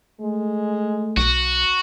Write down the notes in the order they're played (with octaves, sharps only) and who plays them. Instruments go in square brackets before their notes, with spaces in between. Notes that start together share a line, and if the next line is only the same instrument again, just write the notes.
[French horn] G#3 [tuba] A3
[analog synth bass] B1 [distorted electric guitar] F#4